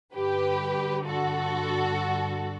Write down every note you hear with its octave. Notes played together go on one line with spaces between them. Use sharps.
G2 D3 G4 B4
F#4 A4